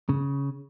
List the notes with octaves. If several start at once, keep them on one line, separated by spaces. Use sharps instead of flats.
C#3